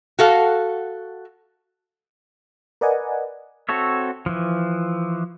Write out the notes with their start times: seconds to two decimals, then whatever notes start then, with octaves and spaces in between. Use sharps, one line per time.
0.19 F#4 A4 F5
2.81 A#4 B4 D5 D#5 F#5 G#5
3.69 C4 F#4 A4 C#5 E5
4.26 E3 F3